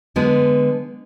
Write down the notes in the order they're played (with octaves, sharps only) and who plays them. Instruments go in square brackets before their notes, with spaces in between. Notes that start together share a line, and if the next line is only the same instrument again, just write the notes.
[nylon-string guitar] D3 G#3 B3